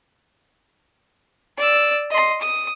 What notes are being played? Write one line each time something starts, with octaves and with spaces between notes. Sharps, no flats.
D5 E6
D#5 C6
D#6